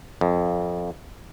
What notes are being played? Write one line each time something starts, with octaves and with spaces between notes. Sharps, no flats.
F2